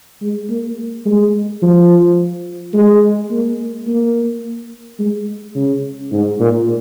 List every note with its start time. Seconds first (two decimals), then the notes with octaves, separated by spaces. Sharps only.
0.21 G#3
0.49 A#3
1.06 G#3
1.62 F3
2.74 G#3
3.30 A#3
3.87 A#3
4.99 G#3
5.55 C#3
6.12 G#2
6.40 A#2